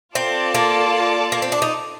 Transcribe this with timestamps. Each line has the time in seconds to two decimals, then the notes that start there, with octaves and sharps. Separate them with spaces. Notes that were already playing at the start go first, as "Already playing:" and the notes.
0.15 C4 F4 A4 D5 A5
0.55 A#3
1.32 A#3
1.42 C4
1.52 D4
1.62 D#4